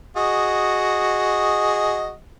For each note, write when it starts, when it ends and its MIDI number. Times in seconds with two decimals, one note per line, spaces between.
0.17 2.14 66
0.17 2.14 68
0.17 2.14 75